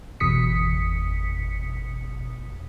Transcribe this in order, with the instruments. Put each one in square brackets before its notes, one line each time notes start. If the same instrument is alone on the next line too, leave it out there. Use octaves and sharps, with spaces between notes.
[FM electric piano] G1 E2 B2 D#6 B6 C#7